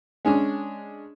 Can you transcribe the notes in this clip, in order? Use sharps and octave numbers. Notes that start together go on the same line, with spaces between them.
G#3 C#4 D4